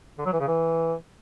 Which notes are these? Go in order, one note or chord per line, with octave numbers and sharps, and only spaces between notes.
D3
F#3
E3
C#3
E3